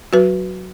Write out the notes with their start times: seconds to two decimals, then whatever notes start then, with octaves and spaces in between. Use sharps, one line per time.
0.13 F#3 F#4 B4